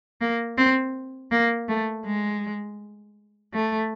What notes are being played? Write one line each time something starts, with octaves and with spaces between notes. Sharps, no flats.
A#3
C4
A#3
A3
G#3
A3